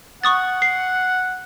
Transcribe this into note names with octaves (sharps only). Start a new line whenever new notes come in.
F#5 C#6 D#6 A6
C7